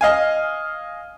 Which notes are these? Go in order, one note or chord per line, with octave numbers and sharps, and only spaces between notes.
D#5 F5 G#5